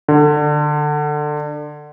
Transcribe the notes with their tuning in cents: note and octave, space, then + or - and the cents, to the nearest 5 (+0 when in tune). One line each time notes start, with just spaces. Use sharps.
D3 +20